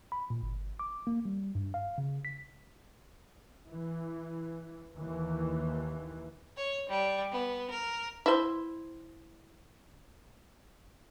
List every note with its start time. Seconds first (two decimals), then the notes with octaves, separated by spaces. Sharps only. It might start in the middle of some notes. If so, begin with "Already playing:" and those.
0.12 B5
0.30 A#2
0.43 G1
0.79 D6
1.07 A#3
1.25 G3
1.55 G2
1.74 F5
1.98 C#3
2.25 B6
3.67 E3
4.95 D#2 E3
6.57 C#5
6.88 G3
7.32 B3
7.71 A#4
8.26 E4 C5